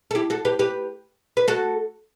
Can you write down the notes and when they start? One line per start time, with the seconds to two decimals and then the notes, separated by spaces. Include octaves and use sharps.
0.11 A4
0.15 E4 G4
0.30 F#4 A4
0.45 G4 B4
0.59 G4 B4
1.37 B4
1.48 F#4 A4